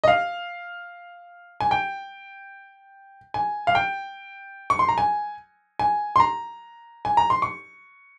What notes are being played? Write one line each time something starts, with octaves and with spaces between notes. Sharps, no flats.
D#5
F5
G#5
G5
G#5
F5
G5
C#6
C6
A#5
G#5
G#5
C6
A#5
G#5
A#5
C6
C#6